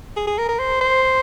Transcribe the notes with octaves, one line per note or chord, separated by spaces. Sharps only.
G#4
G#4
A#4
A#4
C5
C5